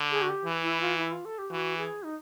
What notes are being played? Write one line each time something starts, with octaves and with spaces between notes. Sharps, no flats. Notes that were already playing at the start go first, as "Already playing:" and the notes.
Already playing: D3
G#4
F#4
G4
E3
E4
F4
E4
F4
A4
G4
E3 F#4
G#4
D#4